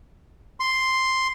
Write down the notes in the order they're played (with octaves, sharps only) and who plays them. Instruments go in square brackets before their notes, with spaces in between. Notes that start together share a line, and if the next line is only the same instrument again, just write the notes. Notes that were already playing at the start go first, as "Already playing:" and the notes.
[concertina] C6